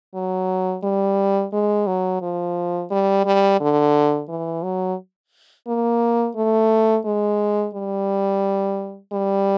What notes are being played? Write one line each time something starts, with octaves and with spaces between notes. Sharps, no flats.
F#3
G3
G#3
F#3
F3
G3
G3
D3
E3
F#3
A#3
A3
G#3
G3
G3